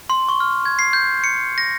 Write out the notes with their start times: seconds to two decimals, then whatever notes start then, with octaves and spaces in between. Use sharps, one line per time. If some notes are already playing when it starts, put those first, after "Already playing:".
0.10 C6
0.29 C#6
0.40 F6
0.65 G#6
0.79 C7
0.93 G6
1.24 C#7
1.58 A#6